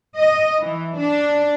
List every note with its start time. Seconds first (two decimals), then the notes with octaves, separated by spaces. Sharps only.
0.17 D#5
0.61 E3
0.98 D4